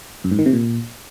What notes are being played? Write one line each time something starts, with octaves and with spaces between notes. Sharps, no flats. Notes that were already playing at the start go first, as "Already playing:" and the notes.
F#2
G#2
D#3
C3
A#2